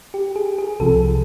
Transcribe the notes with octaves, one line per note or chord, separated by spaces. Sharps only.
G4
G#4
G#4
C2 C3 F3 A4